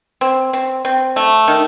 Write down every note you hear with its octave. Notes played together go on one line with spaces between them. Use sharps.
C4
C4
C4
A3
D#3